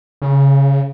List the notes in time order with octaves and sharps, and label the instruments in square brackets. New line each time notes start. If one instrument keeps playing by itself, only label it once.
[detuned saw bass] C#3